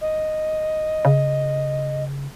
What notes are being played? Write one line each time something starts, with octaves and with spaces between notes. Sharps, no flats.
D#5
C#3